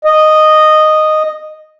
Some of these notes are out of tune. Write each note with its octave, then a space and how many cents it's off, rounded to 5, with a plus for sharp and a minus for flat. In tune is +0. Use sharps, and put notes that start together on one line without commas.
D#5 -10